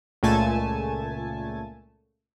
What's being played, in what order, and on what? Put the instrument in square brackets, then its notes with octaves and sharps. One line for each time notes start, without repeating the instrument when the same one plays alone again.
[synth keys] C#2 A#2 A3 G#5 A5